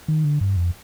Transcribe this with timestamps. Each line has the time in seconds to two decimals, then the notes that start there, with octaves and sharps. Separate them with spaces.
0.08 D#3
0.24 D3
0.41 G2
0.56 F2